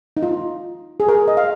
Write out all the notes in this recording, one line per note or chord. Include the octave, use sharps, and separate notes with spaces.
D#4
F4
G#4
A#4
D#5
F5